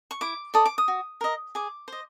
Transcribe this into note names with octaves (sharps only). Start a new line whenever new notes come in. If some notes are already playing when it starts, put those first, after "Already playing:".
C#6
E4 D6
A4 D5 D#6
D6
D#6
F#4
A#4 D#5
G#4 D6
C5 D#5